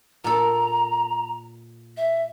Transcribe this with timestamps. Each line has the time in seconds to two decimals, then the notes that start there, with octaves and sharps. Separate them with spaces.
0.24 A#2 A4 A#5
1.97 E5